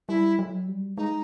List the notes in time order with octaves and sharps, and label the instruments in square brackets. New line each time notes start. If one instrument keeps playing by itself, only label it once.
[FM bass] G3 [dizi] E4
[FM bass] F#3
G3
[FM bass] G#3 [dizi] D#4